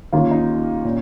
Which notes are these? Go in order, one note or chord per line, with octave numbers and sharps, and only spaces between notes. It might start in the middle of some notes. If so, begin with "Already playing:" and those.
D#2 D#3 A#3 C#4 F4
D#4
A#2 C#4